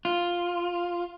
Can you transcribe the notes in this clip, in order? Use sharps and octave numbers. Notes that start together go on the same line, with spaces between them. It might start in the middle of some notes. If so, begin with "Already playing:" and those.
F4